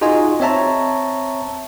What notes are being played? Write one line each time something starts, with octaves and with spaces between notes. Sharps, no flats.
D#4 F4 F#4 G#4 D#5 G#5
C4 C#5 E5 A5 A#5